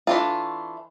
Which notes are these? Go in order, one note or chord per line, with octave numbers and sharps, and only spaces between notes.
E3 A3 D4 F4